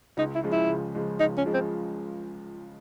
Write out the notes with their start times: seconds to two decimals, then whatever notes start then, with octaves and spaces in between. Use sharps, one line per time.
0.17 C#2 D#4
0.35 E4
0.43 C#3 F3 G#3
0.52 E4
0.69 C#2
0.95 C#3 F3 G#3
1.20 C#2 D#4
1.37 C#4
1.45 C#3 F3 G#3
1.54 C4